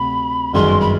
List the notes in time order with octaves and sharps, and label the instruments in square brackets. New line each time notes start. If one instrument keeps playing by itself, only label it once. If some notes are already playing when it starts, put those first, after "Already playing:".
Already playing: [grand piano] D2 C3 [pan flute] B5
[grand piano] G1 F#2 D#3 G#3 [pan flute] C6
[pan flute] B5